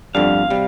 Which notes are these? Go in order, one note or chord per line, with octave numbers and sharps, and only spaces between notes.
G1 F2 D3 G3 D4 F5
C3 G3